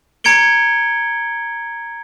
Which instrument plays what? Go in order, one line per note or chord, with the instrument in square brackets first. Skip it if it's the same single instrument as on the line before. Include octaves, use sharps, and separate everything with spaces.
[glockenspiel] A#5 G#6 C#7 D7 G7